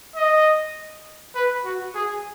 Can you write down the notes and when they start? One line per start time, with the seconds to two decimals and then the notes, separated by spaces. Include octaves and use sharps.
0.15 D#5
1.35 B4
1.65 F#4
1.94 G#4